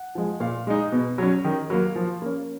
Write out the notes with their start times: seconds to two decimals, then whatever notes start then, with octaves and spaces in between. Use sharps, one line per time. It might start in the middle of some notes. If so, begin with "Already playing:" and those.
Already playing: F#5
0.15 F3 G#3
0.40 A#2 F5
0.67 G#3 D#4
0.92 B2
1.18 F#3 C#4
1.45 D#3
1.70 F#3 A#3
1.96 F3
2.22 A#3 C#4